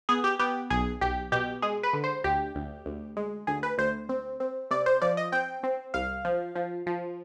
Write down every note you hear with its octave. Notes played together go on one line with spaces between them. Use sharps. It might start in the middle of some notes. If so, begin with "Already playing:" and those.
B3 G#4
G4
B3 G4
B1 G#4
B1 G4
B2 G4
G#3 G#4
B4
D3
C5
D2 G4
D2
D2
G#3
D2 G#4
B4
D2 C5
C4
C4
C3 D5
C5
F3 D5
D#5
C4 G5
C4
C2 F5
F3
F3
F3